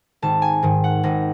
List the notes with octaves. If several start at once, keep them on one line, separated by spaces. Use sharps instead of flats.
G#1 A5
G#5
G#2 D#3
F#5
G#1 D#5